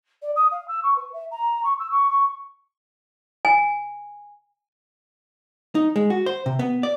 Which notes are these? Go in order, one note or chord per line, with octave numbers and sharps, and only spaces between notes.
D5
D#6
F5
E6
C#6
B4
E5
A#5
C#6
E6
C#6
C#6
G#5
D#4
G#3
F#4
C5
C3
B3
D5